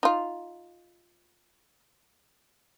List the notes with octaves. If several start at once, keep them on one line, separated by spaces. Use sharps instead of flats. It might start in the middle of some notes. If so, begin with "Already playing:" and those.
D#4 F4